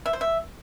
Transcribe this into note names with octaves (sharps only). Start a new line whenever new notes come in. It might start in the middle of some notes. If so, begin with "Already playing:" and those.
E5
C5
E5